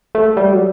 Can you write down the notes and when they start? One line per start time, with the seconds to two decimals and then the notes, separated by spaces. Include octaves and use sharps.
0.15 A3
0.37 G3
0.52 F#3